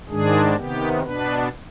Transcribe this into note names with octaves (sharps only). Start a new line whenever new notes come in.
G#2 D#3 G#3 D4 G#4
C3 D#3 B3 G4
B2 B3 D4 B4